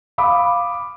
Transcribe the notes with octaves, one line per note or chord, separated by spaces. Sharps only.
F5 B5 D6 D#6